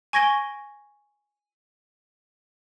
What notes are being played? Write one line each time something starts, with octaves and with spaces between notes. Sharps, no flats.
G#5 C#6 G#6 A#6 D7 G7